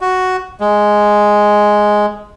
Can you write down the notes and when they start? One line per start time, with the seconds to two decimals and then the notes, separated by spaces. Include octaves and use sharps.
0.01 F#4
0.60 G#3